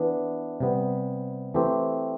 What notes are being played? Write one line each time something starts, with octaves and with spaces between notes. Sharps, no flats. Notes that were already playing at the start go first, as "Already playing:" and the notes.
Already playing: E3 B3 D4
C3 G3 B3
E3 A3 C4 G4